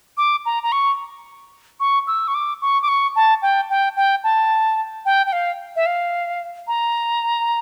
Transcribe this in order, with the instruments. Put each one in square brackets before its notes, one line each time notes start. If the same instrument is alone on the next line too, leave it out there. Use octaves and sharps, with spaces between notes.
[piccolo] D6
A#5
A#5
C#6
C#6
E6
C#6
D6
C#6
D6
C#6
A5
G5
G5
G5
A5
G5
G5
F5
E5
F5
A#5